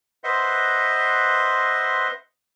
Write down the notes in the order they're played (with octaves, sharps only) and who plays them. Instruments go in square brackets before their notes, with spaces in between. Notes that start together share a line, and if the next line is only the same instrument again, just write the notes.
[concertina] B4 C5 D#5 E5 F#5 C6